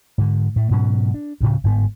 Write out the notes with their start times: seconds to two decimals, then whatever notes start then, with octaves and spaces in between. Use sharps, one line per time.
0.18 G#2 D3
0.56 A2 A3
0.70 G#2 B2 F#3 C#4
1.14 D4
1.41 D2 A2 C#3
1.64 G1 G#2 B3